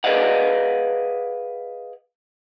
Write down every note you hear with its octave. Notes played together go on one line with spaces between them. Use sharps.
G#4 B4 D5 D#5 F5 F#5